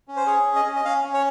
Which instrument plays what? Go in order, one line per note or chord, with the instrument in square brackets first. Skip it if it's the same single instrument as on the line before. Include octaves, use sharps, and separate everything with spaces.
[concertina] C#4
C5
G#4 C#5
C#4
D#5
C#4
D#5
C#4 F5
C#4
C#5